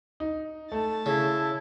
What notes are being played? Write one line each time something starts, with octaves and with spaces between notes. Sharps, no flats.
D#4
A3 A5
C#3 E4